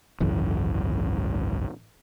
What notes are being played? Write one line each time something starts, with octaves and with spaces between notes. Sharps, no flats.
G#1 C#2 F#2 E3